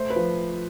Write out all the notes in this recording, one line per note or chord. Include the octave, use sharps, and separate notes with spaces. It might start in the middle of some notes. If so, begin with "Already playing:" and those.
Already playing: A3 C5
B4
F3